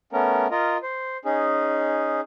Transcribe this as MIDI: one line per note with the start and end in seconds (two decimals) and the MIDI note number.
0.13 0.47 57
0.13 0.47 59
0.13 0.47 61
0.13 0.47 70
0.51 0.77 65
0.51 0.77 70
0.51 0.77 75
0.83 1.17 72
1.25 2.20 61
1.25 2.20 63
1.25 2.20 68